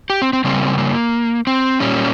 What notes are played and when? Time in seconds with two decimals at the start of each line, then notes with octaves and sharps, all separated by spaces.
0.10 G4
0.22 C4
0.33 C4
0.44 C#3 G3 A#3 C4
0.78 A#3
1.47 C4
1.80 A#2 G3 A#3 C#4